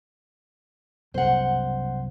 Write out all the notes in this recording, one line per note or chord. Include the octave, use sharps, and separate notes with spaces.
C2 F#2 B2 C5 F#5